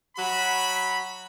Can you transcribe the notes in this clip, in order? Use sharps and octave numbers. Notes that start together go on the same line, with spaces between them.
F#3 F#4 B5